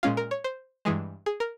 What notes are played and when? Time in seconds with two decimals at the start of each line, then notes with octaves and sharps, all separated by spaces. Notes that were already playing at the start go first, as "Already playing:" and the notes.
0.03 A#2 G#3 C#4 F4 F5
0.17 A#4
0.31 C#5
0.44 C5
0.85 G2 E3 G#3 G#4
1.26 G#4
1.40 A#4